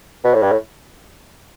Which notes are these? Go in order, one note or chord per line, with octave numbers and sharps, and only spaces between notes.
B2
A2
G2
A2